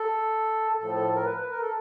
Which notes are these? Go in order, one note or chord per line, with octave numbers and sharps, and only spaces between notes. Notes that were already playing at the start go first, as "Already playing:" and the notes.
Already playing: A4
A2 F3 A4
A4
A#4
B4
B4
A#4
A4